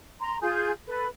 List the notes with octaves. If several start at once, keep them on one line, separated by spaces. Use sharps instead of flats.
A#5 C6
F4 G#4 G6
A4 B4